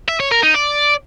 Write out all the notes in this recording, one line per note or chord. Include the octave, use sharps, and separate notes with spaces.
E5
C#5
A#4
D#4
D5